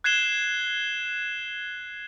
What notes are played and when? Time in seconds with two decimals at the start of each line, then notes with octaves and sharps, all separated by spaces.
0.04 F#6 G#6 C7 E7 G7